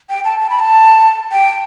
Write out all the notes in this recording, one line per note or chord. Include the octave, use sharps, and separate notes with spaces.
G5
A5
A5
B5
A5
G5